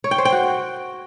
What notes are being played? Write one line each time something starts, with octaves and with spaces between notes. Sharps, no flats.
C#5
G5
C5
G5
F#4